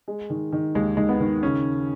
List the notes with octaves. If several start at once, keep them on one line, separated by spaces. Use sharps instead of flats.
G#3
D#3
D#3
D#2 G#3
D#3 G#3
B3
D#3
C#3 C#4